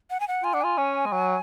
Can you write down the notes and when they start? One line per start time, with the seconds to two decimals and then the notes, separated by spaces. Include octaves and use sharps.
0.10 F#5
0.20 G#5
0.28 F#5
0.44 F4 G#5
0.53 D4 F#5
0.61 F4 G#5
0.78 C#4
1.06 G#3
1.13 F#3